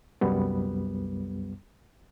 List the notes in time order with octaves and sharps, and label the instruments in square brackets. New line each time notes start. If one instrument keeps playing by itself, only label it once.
[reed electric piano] C2 F#2 G3 B3